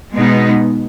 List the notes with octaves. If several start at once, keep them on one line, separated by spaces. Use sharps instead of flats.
B2 G#3 B3 D#4